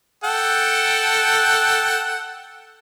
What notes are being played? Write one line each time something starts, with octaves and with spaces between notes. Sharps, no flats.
A4 F#5 G5